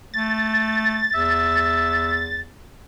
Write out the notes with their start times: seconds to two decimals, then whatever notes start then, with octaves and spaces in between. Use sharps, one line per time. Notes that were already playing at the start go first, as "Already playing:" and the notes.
0.14 A3 A6
1.15 E2 E5